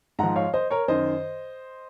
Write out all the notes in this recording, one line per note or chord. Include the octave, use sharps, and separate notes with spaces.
G#2 F3 F#5 A#5
C#5 F5
C5 D#5
A#4 C#5
F#2 D#3 C5 D#5